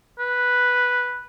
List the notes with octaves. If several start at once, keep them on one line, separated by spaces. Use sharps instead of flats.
B4